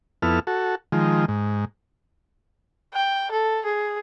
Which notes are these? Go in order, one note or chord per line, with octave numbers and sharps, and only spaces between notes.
F2 B3 E4 A4 F6
F#4 A4
D#3 F3 G#3
G#2
G5
A4
G#4